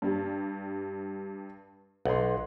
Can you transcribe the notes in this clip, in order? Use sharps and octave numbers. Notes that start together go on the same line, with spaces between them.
G2 G3
B1 F#5 C6